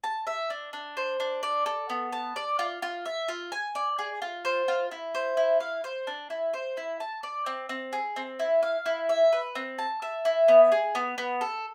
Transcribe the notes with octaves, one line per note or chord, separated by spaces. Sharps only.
A5
E5
D4
D4
C5
D4
D5
A4
B3
A5
D5
F4
F4
E5
F4
G#5
D5
G#4
F4
C5
F4
E4
C5
E4
F5
C5
D4
E4
C5
E4
A5
D5
C4
C4
G#4
C4
E4
F5
E4
E5
B4
C4
A5
E5
E4
B3
G#4
B3
B3
A4